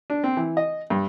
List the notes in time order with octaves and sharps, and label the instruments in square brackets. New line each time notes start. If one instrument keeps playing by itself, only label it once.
[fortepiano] D4
C4
E3
D#5
G2